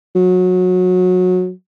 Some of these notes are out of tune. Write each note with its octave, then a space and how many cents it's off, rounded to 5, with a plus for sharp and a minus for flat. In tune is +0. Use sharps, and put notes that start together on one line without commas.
F#3 -20